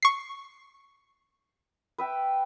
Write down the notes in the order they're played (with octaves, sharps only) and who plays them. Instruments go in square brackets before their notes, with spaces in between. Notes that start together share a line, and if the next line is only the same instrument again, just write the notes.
[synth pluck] C#6 C7
[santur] B4 E5 G5